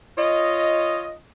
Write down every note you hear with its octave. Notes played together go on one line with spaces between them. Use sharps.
F4 C#5 D#5